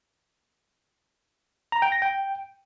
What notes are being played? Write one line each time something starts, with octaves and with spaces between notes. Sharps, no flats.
A#5
G5
A#6
G5